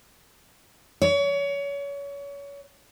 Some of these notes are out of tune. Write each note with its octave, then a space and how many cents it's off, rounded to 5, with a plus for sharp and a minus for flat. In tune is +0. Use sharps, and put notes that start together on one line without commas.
C#5 +30